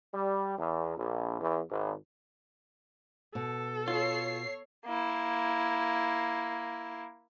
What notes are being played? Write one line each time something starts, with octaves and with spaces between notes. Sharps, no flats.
G3
E2
A#1
E2
G#1
B2 A4
F4 C#5 C7
A#3 E4